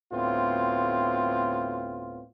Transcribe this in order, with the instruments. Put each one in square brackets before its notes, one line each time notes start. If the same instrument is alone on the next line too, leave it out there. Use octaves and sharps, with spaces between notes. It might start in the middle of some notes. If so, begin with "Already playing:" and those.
[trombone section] D2 A2 B3 C4 F4